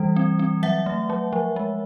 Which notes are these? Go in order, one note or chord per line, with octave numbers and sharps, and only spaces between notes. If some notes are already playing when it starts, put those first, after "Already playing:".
Already playing: E3 G3
C4
C4
F#3 E5 F#5
A3
F#3
F3
G#3